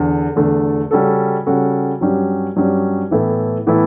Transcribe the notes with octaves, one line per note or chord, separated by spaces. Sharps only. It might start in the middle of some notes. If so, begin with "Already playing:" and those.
Already playing: E2 D3
E2 D3 A3
C#3 G3 C#4 F#4 A4
C#3 G3 C#4 F#4 A4
G2 F#3 C#4 G4
G2 F#3 C#4 G4
A2 E3 B3 E4 A4
A2 E3 B3 E4 A4